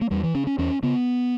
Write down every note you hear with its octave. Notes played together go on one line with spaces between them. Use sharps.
A#3
E2 G3
E3
C#3 C#4
C#4
E2 C#4
C#3 B3